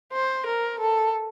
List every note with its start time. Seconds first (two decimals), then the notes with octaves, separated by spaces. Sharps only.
0.13 C5
0.47 A#4
0.80 A4